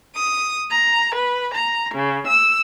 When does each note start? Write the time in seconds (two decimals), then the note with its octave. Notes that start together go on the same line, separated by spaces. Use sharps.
0.15 D#6
0.70 A#5
1.14 B4
1.54 A#5
1.94 C#3
2.27 E6